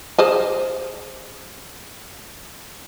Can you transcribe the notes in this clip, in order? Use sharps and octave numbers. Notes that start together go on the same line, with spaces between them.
G#4 C5 D#5